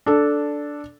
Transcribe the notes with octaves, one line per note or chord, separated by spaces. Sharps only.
D4 A4